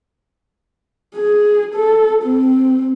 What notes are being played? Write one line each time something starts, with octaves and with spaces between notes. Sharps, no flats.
G#4
A4
C4